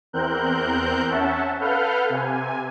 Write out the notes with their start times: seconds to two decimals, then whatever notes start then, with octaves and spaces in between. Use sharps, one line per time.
0.13 E2 C4 A#4 F#6 G6
1.09 C#4 E5 F#5 A5
1.60 A4 B4 F5 F#5 F6 G6
2.09 C3 G#5